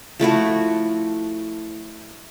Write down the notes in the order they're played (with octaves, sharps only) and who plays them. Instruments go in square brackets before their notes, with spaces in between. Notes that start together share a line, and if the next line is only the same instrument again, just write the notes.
[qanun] F3 A3 E4 F#4